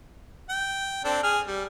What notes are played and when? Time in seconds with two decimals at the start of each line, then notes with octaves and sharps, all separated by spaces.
0.49 G5
1.04 C4 D4 A4
1.23 G#4 F6
1.47 G3